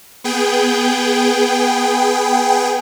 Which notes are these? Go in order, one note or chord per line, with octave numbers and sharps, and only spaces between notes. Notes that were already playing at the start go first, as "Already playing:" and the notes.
B3 G#4 G5